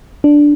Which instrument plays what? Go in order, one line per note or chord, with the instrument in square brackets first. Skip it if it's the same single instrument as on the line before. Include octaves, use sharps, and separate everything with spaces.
[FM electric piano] D4